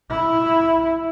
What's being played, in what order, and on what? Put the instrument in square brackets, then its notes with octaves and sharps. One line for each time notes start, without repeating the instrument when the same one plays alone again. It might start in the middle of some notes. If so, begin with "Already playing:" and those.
[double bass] E4